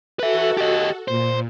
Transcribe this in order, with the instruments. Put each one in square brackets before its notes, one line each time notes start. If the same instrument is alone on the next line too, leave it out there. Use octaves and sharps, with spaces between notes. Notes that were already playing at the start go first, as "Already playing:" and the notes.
[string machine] F#4 A4 [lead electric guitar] B4 E5
[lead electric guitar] G4 D#5
[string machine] A#2 [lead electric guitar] C5